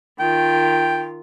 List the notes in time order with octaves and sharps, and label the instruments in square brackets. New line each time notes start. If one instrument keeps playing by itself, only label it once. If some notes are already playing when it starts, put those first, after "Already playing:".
[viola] D#3 F4 [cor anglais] G5